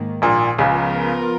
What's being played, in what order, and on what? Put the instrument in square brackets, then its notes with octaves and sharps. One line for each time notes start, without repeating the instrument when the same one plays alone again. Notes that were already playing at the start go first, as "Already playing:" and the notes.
Already playing: [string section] G#2 D#3 A#3
[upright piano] A#1 A#2
[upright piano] C#2 C#3 [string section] F3 B3 F4 A#4